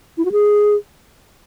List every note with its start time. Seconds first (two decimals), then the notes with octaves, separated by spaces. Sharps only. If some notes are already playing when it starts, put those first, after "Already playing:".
0.18 E4
0.25 F#4
0.32 G#4